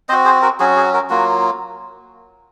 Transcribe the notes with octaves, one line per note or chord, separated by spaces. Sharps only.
C4 F#4 C5 D#5
G#4 C5
F#4 A#4
F#3 C#4 F#4 G#4
G#4
F#4 A#4
F#3 A#3 F4 F#4